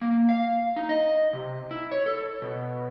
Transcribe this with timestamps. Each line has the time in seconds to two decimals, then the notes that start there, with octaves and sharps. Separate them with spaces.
0.01 A#3
0.29 F5
0.76 D#4
0.89 D#5
1.33 C3
1.71 E4
1.91 C#5
2.06 A4
2.42 B2